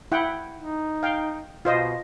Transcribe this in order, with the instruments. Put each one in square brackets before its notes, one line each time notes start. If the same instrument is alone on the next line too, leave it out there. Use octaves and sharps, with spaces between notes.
[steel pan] E4 F#5 G5
[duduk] D#4
[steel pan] F5 G5
[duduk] B2 [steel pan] F4 C5 D#5